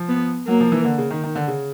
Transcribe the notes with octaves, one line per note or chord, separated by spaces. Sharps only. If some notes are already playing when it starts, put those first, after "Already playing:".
Already playing: F3
B3
F#3 A#3
F3
E3
D3
C#3
D#3
D#3
D3
C#3